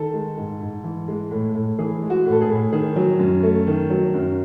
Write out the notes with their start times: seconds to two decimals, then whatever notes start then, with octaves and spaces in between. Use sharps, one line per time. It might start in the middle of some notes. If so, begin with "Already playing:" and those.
Already playing: D#3 A4
0.13 G#3
0.37 G#2
0.61 G#2
0.84 E3
1.08 G#3
1.31 A2
1.54 A2
1.79 E3 G#4
2.02 G#3
2.10 F#4
2.26 A2
2.32 A4
2.41 G#4
2.49 A2
2.72 D#3 G#4
2.96 F#3
3.19 F#2
3.43 A3
3.67 D#3
3.90 F#3
4.14 F#2